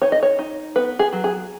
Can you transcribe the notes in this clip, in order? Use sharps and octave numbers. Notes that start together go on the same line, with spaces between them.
D#4 C#5
D#5
C#5
D#4
B3 B4
G#4
F#3
G#4